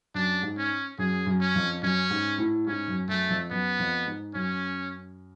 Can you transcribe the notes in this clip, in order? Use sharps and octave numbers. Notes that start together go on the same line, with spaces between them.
F#2 D4
G#2
C#4
F#2 G#4
F#2
C#4
F2
F#2 C#4
G#2
A2
G#2 C#4
F#2
F#2 A3
F2
F#2 B3
F2
G#2
F#2 C#4